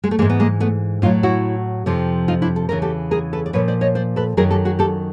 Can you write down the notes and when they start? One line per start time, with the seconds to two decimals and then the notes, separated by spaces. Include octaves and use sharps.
0.04 G#3
0.11 A3
0.19 E3 G#3 A#3
0.22 G#2
0.30 B3
0.40 G#3 A#3
0.60 A3 B3
1.02 A2 F#3 D#4 F4
1.23 E4 F#4
1.86 F2 C3 F3
2.28 D#4 F4
2.42 D4 E4
2.56 A4
2.69 E2 C#3 E3 A#4
2.82 G4 A4
3.11 G#4 A#4
3.33 A4 B4
3.46 D5
3.53 A#2 F3 B4 C#5
3.68 C5 D5
3.81 C#5 D#5
3.95 C5 D5
4.16 A4 B4
4.37 F#2 D#3 F#3 G#4 A#4
4.51 G4 A4
4.65 F#4 G#4
4.79 G4 A4